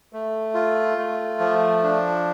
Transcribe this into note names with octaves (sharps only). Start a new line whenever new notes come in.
A3
F4
A3
F3
D4